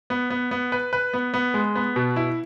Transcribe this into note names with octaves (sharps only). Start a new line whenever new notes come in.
B3
B3
B3
B4
B4
B3
B3
G#3
B3
B2
E4